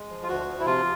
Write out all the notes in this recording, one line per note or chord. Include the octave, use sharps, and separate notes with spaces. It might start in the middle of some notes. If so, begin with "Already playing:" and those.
Already playing: G#3
F3
F4
D2 F#4
F3
E4
C3 F4